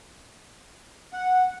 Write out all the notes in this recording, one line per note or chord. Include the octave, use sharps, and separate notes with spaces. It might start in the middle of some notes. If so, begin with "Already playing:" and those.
F#5